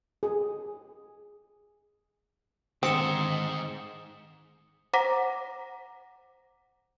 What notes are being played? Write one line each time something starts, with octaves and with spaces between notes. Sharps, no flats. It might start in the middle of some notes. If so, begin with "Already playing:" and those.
G#4
G#2 D3 D#3 C4 D#6 C#7 E7
C5 F#5 A#5 D6 A#6 B6